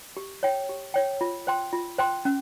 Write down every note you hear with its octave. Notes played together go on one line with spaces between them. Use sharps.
G4
C#5 G5
G4
C#5 G5
F4
C5 G5 C6
F4
C5 G5 C6
C#4